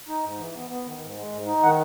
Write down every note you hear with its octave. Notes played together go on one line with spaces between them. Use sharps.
D#4
G#2
E3
B3
B3
D#3
G#2
G#3
G#2
D#4
D#3 F#5